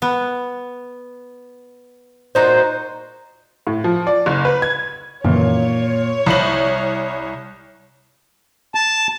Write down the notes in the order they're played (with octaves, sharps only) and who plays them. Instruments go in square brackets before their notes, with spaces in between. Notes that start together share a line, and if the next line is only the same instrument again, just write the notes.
[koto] B3
[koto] A#2 D#4 F#4 [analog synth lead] C5
[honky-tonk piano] A2
F3
D5
F#1
B4
G#6
[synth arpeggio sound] F#2 D#3 E3 [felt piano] A#2 A#3 [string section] C#5
[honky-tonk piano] C2 F#7 [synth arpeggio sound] F3 [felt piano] B5
[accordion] A5